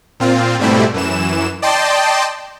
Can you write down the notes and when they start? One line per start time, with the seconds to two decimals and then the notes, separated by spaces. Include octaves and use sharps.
0.20 A#2 C4 F4
0.59 G#2 B2 G3 A3 C4 E4
0.94 F#2 E3 E7
1.62 D5 D#5 G5 A5 C6